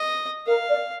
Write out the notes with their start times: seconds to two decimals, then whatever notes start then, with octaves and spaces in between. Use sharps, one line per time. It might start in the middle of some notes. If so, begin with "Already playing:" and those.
Already playing: D#5
0.47 A#4 F5
0.68 D5